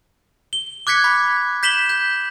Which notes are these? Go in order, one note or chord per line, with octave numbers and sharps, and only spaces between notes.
G7
D6 F#6 G#6 B6 C#7
B5
G6 B6 E7 F#7 G7
G6